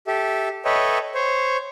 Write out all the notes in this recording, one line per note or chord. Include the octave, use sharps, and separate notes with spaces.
G4 A4 E5
A4 B4 C#5 D#5 E5 G5
C5 C#5